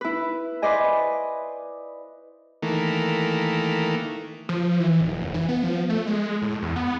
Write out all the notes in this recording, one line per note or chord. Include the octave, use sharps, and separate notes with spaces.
E4 B4
B4 C5 D5 D#5 G#5
D#3 E3 A3 A#3
F3
E3
D#1
F1
E3
B3
F3
A3
G#3
A2
E2
B3